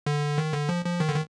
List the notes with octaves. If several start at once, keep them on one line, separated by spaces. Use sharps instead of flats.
D3
D#3
D3
F3
F3
D#3
D3
D#3